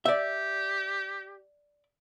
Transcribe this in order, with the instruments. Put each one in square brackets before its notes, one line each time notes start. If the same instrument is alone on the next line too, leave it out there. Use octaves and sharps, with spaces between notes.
[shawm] G4 [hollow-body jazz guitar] D5 E5